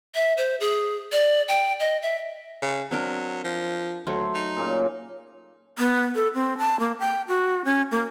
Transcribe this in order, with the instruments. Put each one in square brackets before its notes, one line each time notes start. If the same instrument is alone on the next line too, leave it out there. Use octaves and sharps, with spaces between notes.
[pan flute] E5
C5
G#4
D5
G5
D#5
E5
[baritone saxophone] C#3
[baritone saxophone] F#3 [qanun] C4 D4 A#4
[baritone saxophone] F3
[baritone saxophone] D2 [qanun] F#3 A3 [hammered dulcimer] C5 F#5
[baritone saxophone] D#4
[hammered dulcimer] A#2 C#3 A#3
[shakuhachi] B3
A4
C4
A5
A#3
G5
F#4
C#4
A#3